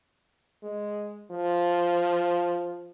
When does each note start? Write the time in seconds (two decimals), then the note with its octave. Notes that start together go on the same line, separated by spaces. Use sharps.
0.63 G#3
1.31 F3